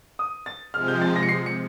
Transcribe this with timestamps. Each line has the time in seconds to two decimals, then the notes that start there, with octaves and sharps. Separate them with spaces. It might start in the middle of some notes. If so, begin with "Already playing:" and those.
0.19 D#6
0.46 A6
0.74 C3 F3 G#3 F6
0.88 G6
1.02 A6
1.16 A#6
1.23 C#7
1.29 C7
1.46 C#7